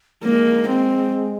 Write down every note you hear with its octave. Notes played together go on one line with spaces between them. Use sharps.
G#3 A#3
C4